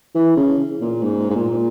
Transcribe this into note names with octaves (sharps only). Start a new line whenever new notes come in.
E3
C#3
A#2
G#2
G#2
A#2